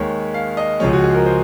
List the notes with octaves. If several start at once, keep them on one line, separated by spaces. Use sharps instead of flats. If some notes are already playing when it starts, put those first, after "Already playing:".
Already playing: D#2 D#3 G#3 C#5
F5
D#5
C#2 C#3 F3 G#3 C#5
F#4
G#4
A#4
C5